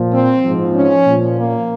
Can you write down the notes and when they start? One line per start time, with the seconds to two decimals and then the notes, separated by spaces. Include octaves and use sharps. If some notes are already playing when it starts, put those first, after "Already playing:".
Already playing: A#2 F3
0.14 C4
0.44 G#2 F3
0.74 C#4
1.05 A#2 F3
1.35 A#3